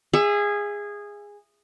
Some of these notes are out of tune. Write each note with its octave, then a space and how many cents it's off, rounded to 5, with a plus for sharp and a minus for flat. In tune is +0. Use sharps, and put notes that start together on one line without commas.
G#4 -15 E5 +20